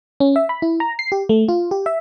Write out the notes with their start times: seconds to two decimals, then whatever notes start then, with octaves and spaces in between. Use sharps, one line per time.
0.20 C#4
0.36 E5
0.49 B5
0.62 E4
0.80 A#5
0.99 C7
1.12 G4
1.29 A3
1.49 F4
1.71 G4
1.86 E5